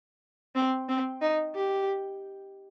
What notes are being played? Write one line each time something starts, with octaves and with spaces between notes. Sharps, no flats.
C4
C4
D#4
G4